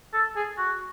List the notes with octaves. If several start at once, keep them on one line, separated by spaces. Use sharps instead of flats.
A4
G#4
F#4